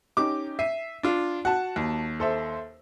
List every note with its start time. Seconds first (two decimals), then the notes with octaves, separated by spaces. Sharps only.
0.17 C#4 D#4 G4 D6
0.59 E5 C7 D#7
1.03 D4 F4
1.45 F#4 F#5 A5
1.76 D#2
2.20 A4 C5 E5